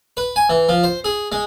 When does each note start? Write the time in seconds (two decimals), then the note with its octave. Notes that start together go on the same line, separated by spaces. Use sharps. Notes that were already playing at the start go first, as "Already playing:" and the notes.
0.17 B4
0.36 G#5
0.49 E3
0.69 F3
0.84 C5
1.04 G#4
1.32 G#3